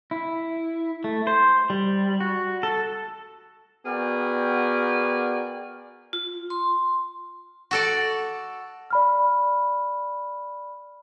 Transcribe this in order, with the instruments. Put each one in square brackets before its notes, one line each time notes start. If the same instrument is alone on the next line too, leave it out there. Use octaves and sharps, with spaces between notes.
[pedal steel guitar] E4
A3
C5
G3
F#4
A4
[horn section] B3 F#4 G#4 A#4 D5 G5
[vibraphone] F4
C6
[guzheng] F#4 A4 D5
[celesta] D5 B5 F6